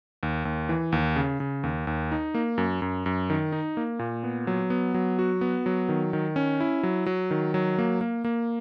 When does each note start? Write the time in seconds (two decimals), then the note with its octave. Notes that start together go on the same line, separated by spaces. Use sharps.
0.23 D#2
0.45 D#2
0.69 E3
0.92 D#2
1.16 C#3
1.40 C#3
1.63 D#2
1.87 D#2
2.12 D#4
2.34 A#3
2.58 F#2
2.82 F#2
3.06 F#2
3.30 D#3
3.52 D#4
3.77 A#3
3.99 A#2
4.24 B3
4.47 F#3
4.70 B3
4.94 F#3
5.19 F#4
5.41 B3
5.66 F#3
5.89 D#3
6.13 D#3
6.36 C#4
6.60 E4
6.83 F#3
7.06 F#3
7.31 D#3
7.54 F#3
7.78 A#3
8.01 A#3
8.25 A#3